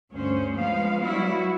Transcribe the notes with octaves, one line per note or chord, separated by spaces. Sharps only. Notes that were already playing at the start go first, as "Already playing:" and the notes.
D2 G2 C#4 C5
F3 G#3 B3 F5
F#3 G3 E4 F#4